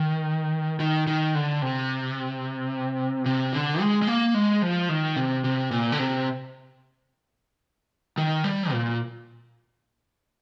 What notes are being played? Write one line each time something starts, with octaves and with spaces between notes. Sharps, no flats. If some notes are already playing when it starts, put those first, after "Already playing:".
Already playing: D#3
D#3
D#3
D3
C3
C3
D3
G#3
G#3
A#3
G#3
F3
D#3
C3
C3
A#2
D3
C3
D#3
G3
A#2